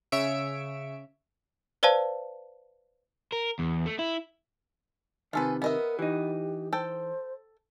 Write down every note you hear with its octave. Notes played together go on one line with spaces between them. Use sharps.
C#3 C#5 E5 E6 C#7 D7
B4 C5 D5 F5 A5
A#4
E2
A3
E4
C3 D#3 F4 A4 B4 G#5
B3 A#4 D#5 E5
E3 D#4 G4
A4 C5 G5